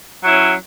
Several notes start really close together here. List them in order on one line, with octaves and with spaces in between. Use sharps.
F#3 E4 C#4